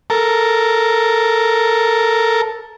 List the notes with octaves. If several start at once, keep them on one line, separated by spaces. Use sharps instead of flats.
A4 A#4